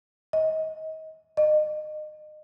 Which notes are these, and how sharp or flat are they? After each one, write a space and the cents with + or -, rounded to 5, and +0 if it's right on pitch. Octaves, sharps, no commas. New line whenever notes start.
D#5 +30
D#5 -30